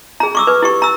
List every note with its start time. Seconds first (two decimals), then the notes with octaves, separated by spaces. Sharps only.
0.20 G#4 A#5
0.35 C#6 D6 E6
0.47 B4
0.62 E4 G4 C#6
0.82 A#5 E6